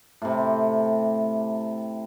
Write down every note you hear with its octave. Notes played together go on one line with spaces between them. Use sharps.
A2 C3